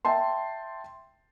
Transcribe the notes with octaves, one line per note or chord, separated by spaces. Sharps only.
E5 G5 A5 C6